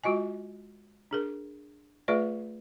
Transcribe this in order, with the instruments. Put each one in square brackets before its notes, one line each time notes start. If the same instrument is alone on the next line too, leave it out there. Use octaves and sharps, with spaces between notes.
[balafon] G#3 F4 F#4 D#5 G#5
D4 G#4 A#4
A3 F4 G#4 B4 D5 E5